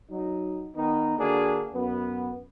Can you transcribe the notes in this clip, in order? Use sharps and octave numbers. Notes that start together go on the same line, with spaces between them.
F#3 D#4
D#3 B3 D#4
D3 A#3 D4 F#4 G#4
F#2 B3